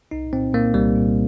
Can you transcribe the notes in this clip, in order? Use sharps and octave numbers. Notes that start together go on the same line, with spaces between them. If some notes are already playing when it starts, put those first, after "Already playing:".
C2 D#4
A#2 C4
A#2 A#3
C2 G3
A#2